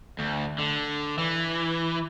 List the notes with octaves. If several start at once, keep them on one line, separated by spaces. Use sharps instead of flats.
D2
D3
E3